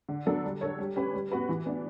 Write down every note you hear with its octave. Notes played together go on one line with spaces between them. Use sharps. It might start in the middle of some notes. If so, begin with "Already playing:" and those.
D3
F#3 B3 D4 A4
G3
D4 A4 C#5
G3
C#4 G4 B4
G3
B3 F#4 B4
E3
B3 D4